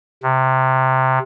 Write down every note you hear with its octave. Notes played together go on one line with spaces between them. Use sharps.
C3